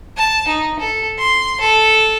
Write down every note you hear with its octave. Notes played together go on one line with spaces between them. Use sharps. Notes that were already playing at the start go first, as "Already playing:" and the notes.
A5
D#4
A4
C6
A4